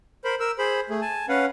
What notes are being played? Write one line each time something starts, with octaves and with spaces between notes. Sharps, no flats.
A#4 C5 B5
A#4 E6
G#4 C5 B5
A3 G#4
G#5 A5
C#4 B4 F5 F#5